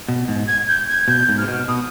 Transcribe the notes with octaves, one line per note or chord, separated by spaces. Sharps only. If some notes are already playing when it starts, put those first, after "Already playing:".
B2
G#2
G#6
G6
G#6
B2 G6
G#2
C3 F6
B2
B2 D#6